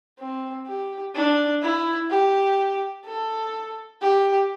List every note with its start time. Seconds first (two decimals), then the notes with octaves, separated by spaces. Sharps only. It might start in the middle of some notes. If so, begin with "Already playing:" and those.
0.19 C4
0.67 G4
1.15 D4
1.62 E4
2.10 G4
3.05 A4
4.01 G4